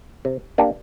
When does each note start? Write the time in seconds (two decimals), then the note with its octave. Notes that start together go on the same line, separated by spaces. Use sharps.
0.25 C3
0.58 A#3 D4 G4